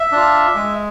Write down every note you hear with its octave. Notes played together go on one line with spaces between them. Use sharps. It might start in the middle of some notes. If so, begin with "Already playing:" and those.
Already playing: E5
D4 F4
G#3